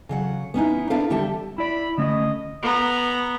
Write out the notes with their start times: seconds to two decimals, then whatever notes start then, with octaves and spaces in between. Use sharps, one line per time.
0.09 C#3 F#3 F#5
0.54 B3 C#4 D#4 E4
0.90 B3 D4 E4 A#4 B4 F5
1.10 D3 G3 G4 E5 A5
1.58 E4 D5 B5
1.98 D3 A3 C#4 D#5
2.62 B3 A#5